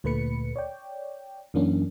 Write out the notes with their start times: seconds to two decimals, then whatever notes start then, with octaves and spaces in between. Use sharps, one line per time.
0.04 D2 A#2 A3 B4 B5 C#7
0.56 C#5 D5 G5
1.54 F#2 E3 A#3 C#4 D4